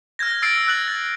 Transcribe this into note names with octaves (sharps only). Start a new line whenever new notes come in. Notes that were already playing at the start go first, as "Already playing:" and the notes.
F6 G6 G#6 A#6
E6 A6 C7 D7
E6 F#6 A6 F#7
A6